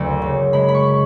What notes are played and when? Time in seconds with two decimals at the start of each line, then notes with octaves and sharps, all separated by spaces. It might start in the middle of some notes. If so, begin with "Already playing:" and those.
Already playing: F#1 D2
0.22 C#3
0.53 G#3 B5
0.68 B5
0.74 C#6